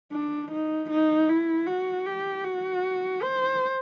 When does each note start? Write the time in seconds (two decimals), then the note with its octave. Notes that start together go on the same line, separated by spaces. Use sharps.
0.12 D4
0.51 D#4
0.90 D#4
1.28 E4
1.67 F#4
2.06 G4
2.44 F#4
3.22 C5